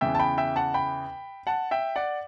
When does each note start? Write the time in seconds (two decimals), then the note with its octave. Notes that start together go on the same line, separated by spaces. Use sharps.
0.01 E2 C#3 E3 E5 G5
0.15 A5
0.19 G5 B5
0.38 E5 G5
0.56 F#5 A5
0.74 G5 B5
1.47 F#5 A5
1.71 E5 G5
1.96 D5 F#5